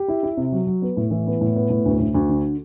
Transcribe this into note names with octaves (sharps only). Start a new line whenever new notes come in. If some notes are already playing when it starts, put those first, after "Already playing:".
Already playing: G4
E4
E4
C3
F#3
F#3
B3
A2
E3
B3
A2
B3
A2
D2
D2
D2
D3